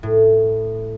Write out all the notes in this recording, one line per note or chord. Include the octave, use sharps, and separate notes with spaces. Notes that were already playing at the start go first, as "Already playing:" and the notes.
A2